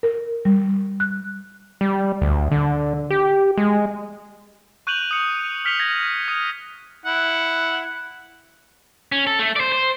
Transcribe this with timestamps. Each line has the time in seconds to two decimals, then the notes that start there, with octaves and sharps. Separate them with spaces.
0.03 A#4
0.45 G3
1.00 F#6
1.81 G3
2.22 D2
2.51 D3
3.10 G4
3.58 G#3
4.87 C#6 F#6 G6 D#7 F7 F#7
5.11 D#6 C#7
5.65 F6 B6 C#7 F7 G7
5.79 G#6 A#6
6.28 D#6 G#6 D#7
7.05 E4 F#5
9.12 C#4
9.27 A4
9.39 A3
9.56 C5 D5
9.72 C5